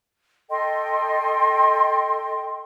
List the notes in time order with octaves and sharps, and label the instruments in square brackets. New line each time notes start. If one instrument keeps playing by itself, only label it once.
[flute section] A4 D#5 G5 C6